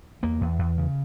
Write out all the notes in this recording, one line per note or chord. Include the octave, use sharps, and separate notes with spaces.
E2 A#3
E2
E2
C#3